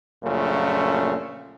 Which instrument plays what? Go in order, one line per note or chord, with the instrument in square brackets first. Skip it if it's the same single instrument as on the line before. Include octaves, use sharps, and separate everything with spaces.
[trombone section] A#1 F#2 A#2 C#3 A3